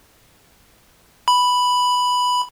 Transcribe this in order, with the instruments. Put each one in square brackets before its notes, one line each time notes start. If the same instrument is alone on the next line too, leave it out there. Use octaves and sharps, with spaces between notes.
[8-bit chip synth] B5